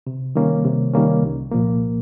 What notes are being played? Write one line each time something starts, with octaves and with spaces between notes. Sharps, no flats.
C3
D#3 G3 A#3 C#4
C3
D#3 G3 A#3 C#4
C2
A#2 F3 A#3